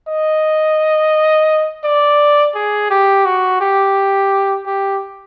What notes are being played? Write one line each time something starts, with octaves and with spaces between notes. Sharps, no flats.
D#5
D5
G#4
G4
F#4
G4
G4